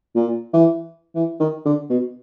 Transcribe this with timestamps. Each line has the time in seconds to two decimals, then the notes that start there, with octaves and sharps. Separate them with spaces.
0.15 A#2
0.54 E3
1.15 E3
1.40 D#3
1.66 D3
1.90 B2